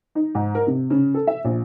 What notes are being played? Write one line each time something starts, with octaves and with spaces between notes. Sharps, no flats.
D#4
G#2
A#4
C3
C#3
A4
E5
A#1